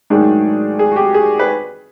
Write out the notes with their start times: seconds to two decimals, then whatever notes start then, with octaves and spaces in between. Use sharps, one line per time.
0.10 G#2 D#3 F#3 A3 D4 G#4
0.79 G#4
0.92 F#4
0.96 G4
1.14 G#4
1.39 B4